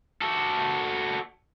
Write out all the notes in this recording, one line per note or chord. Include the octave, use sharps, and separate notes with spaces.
F#4 A4